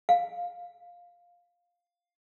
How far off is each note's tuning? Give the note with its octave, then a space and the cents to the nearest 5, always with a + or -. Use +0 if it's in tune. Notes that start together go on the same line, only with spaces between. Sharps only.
F5 +5